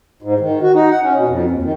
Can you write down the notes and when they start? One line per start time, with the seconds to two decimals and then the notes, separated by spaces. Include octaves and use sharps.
0.22 G#2
0.40 D#3
0.62 F#4
0.74 D#4
0.90 F#5
1.02 C#4
1.15 B2
1.28 F2
1.50 D#2
1.62 D#3